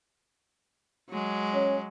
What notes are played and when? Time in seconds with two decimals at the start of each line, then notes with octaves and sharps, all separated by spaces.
1.10 F#3 G#3
1.53 C#4